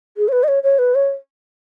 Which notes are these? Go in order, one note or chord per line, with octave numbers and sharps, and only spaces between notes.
G#4
C#5
B4
D#5
C#5
C#5
B4
C#5